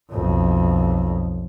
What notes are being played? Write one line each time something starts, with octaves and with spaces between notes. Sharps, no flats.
B1 F2